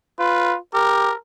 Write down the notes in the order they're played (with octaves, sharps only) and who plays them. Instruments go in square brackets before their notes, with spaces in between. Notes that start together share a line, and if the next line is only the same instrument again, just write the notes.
[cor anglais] F4 [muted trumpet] B4
[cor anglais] G4 [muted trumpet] A#4